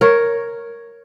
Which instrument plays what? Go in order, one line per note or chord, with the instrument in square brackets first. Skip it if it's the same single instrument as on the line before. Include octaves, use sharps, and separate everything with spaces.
[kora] A#4 C#5